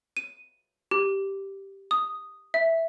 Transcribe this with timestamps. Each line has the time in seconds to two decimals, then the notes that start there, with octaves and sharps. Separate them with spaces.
0.17 D#7
0.91 G4
1.91 D#6
2.54 E5